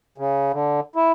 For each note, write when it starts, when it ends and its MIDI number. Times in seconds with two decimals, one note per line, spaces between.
0.18 0.52 49
0.53 0.80 50
0.96 1.12 64